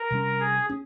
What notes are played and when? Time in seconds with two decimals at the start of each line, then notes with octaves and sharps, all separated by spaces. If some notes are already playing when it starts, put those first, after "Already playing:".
Already playing: A#4
0.10 C3 G3 C#4
0.40 G#4
0.69 C#4